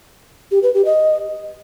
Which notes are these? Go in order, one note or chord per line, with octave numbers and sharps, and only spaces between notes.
G4
B4
G4
D#5